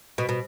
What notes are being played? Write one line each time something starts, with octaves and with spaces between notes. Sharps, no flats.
B2
B2